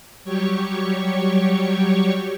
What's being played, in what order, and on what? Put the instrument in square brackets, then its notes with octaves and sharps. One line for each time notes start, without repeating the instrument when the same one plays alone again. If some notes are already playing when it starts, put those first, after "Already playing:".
[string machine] F#3 G3 G4 C#5 C#6